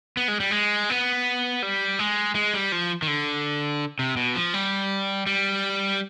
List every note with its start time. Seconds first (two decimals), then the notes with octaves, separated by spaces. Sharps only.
0.17 B3
0.28 G#3
0.40 G3
0.51 G#3
0.90 B3
1.63 G3
1.99 G#3
2.35 G#3
2.54 G3
2.72 F3
3.02 D#3
3.07 D3
3.99 C3
4.17 B2
4.35 F3
4.54 G3
5.27 G3